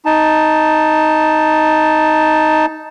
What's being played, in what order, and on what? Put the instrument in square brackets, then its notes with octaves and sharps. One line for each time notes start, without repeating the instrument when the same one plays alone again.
[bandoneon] D#4 A5